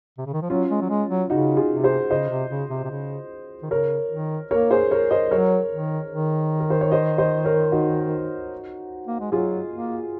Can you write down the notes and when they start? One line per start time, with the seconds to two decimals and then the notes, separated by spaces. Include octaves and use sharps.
0.18 C3
0.27 C#3
0.34 D#3
0.42 F3
0.50 F#3 C#4 F4
0.71 G#3
0.81 F#3
0.90 G#3
1.10 F#3
1.30 C#3 D#4 F#4
1.57 F4 G#4
1.70 C3
1.83 G#4 C5
2.11 C#3 C5 D#5
2.30 C3
2.50 C#3
2.70 C3
2.84 C3
2.90 C#3
3.63 D#3
3.71 C#3 A#4 C#5
4.11 D#3
4.51 A#3 A#4 C#5
4.71 G#4 C5
4.91 A#4 C#5
5.11 C5 D#5
5.31 F#3 A#4 C#5
5.72 D#3
6.11 D#3
6.60 A#4
6.70 C5
6.81 C#5
6.91 C5 D#5
7.18 C5 D#5
7.45 A#4 C#5
7.72 D#4 F#4
9.07 A#3
9.21 G#3
9.32 F#3 F4 G#4
9.72 A#3